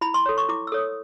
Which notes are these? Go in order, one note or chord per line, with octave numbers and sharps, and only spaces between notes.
E4 B5
C6
A4 C#5
C#6
E4 D6
E6
A4 C#5 D#6